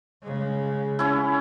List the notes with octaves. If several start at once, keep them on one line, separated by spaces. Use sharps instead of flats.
C#3 G#3
C#4 E4